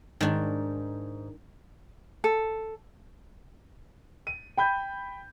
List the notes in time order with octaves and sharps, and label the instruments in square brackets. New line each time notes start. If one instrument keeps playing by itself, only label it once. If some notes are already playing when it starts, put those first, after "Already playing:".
[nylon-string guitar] G#2 [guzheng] D#3 D4
[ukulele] A4
[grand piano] D#7
G5 B5 G6